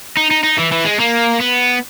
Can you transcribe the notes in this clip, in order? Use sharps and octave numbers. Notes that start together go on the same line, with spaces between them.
D#4
D#4
D#4
E3
E3
G#3
A#3
B3